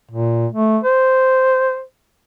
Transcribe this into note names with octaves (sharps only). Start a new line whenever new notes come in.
A#2
A3
C5